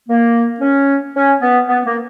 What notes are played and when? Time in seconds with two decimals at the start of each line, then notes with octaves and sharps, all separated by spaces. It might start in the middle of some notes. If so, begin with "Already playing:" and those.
0.09 A#3
0.61 C#4
1.15 C#4
1.41 B3
1.68 B3
1.85 A#3